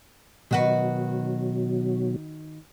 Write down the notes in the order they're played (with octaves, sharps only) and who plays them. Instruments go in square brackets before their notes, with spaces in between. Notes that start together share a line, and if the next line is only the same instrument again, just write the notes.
[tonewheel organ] B2 F#3 [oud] D#3 F#4 B4